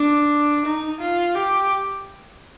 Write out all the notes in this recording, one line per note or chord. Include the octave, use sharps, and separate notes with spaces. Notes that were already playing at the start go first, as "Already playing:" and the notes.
Already playing: D4
D#4
F4
G4